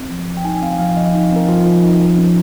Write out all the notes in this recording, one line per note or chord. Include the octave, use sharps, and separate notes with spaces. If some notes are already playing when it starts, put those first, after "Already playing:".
Already playing: C4
F3
F3
G5
D#4 G#5
C4 F5
F3 F5
F3 D#5
D#4
C4 A#4
F3 F4
F3
D#4
F3
C#4